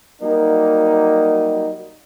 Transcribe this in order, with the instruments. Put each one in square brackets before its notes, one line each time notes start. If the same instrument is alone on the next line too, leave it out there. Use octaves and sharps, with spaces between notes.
[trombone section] F#3 G3 A#3 D#4